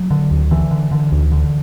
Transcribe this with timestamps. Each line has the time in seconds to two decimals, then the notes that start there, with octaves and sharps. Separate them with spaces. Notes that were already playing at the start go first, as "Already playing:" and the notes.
Already playing: F#3
0.11 D3
0.31 D2
0.51 D3 E3
0.71 D3
0.91 D3
1.12 D2
1.32 D3